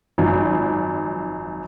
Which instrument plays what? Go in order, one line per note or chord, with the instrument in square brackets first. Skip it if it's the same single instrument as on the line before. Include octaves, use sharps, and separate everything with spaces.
[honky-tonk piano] G#1 F#2 F3